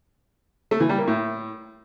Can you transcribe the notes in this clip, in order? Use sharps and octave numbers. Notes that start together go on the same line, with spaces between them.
A3
E3
G3
A#3
A2